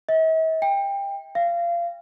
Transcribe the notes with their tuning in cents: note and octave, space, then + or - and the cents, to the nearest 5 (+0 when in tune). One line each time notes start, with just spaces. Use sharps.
E5 -45
G5 +25
F5 -25